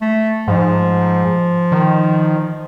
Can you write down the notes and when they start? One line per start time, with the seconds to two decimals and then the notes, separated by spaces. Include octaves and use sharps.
0.01 A3
0.48 G#2 F3
1.72 D#3